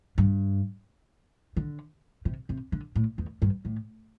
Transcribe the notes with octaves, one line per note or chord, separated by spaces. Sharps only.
G2
D3
C3
C3
D3
A2
E2
G2
A2